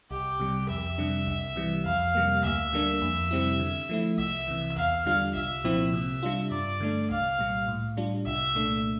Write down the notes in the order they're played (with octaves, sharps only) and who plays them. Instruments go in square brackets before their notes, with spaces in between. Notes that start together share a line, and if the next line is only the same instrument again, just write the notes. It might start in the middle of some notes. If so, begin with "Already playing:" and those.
[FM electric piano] C2 [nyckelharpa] G4
[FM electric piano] C3 G3
[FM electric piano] F2 [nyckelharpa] E5
[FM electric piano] C3 G3 D4
C2
C3 E3 G3
[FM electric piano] F2 [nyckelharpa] F5
[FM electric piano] C3 G3 A#3
[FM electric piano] D2 [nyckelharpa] E5
[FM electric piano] D3 G3 A#3 D4
F2
C3 G3 C4 E4
D3
F3 A3 E4
[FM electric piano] C2 [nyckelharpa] E5
[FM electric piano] C3 E3
[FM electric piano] E2 [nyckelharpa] F5
[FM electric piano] D3 G3 D4 F4 [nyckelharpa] F5
[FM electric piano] C2 [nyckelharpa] E5
[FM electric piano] A#2 F3 C4 E4
C3
G3 D4 F4
[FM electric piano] G2 [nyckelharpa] D5
[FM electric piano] D3 A3 D4
[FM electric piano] C2 [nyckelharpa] F5
[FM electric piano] A#2 G3
A2
G3 D4 F4
[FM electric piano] C2 [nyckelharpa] E5
[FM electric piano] A#2 A3 D4